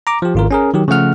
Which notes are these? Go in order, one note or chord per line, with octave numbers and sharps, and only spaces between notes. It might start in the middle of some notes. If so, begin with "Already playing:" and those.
A#5 D6
F3 G4
G#1 F4 A#4
C#4 G#4 A#4
D#3 F#3 G4
C#3 F3 A3 F#5 F6